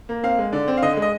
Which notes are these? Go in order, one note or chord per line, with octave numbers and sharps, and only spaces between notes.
A#3
C4 F5
G#3
D3 D5
C4
F5
D3 D#5
G#3
D#5